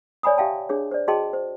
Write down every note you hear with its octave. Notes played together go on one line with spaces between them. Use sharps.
C#5 D5 G#5 B5 D#6
G4 E5 F5 G5 A5
D4 G#4 C#5
C5 D5
F#4 G#4 D#5 G5 A5 C6
C5